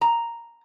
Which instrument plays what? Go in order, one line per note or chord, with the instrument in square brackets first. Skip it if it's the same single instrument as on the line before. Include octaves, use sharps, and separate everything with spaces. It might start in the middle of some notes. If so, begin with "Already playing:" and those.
[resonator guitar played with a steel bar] A#5